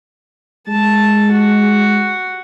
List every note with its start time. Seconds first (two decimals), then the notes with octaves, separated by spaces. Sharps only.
0.68 G#3 A5
1.32 F#4